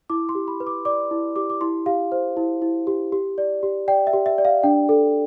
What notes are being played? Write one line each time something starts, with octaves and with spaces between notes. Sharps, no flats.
E4 D6
C6
G4
B5
B4
D6
D5 D6
E4
G4 D6
D6
E4 C6
G4 F5
C5
E4
E4
G4
G4
D5
G4
D5 G5
E5
G4
E5
D5
F5
D4 G5
A4